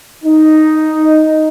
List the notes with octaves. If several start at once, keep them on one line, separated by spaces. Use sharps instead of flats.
D#4